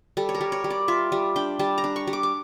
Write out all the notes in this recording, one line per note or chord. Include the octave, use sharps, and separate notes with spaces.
G3 A4
C#5
A#4
G3
C#5
G3
D5
F4 E5
G3
D4 G5
G3 A5
A#5
D4
C#6
G3
D6
D6